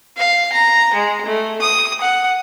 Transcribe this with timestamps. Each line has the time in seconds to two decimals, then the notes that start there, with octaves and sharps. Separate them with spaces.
0.18 F5
0.52 A#5
0.94 G#3
1.26 A3
1.62 D#6
2.01 F#5